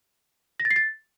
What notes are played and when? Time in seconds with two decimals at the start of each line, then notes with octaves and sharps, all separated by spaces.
0.60 A#6
0.65 A6
0.71 C7
0.76 A6